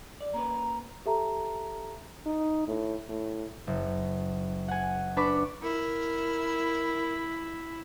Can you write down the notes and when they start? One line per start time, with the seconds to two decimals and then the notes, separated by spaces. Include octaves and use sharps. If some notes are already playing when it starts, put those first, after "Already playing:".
0.21 D5
0.34 A#3 C#4 B4 A#5
1.06 G4 A4 E5 A5 A#5
2.26 D#4
2.68 A2
3.09 A2
3.67 F#1
4.68 F#5 G#5
5.17 D4 B4 B5 C#6 D6
5.63 E4 A#4